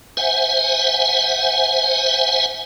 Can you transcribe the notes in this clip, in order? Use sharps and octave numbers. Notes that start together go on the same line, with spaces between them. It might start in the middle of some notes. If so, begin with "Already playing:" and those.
C5 E5 F#5 G#5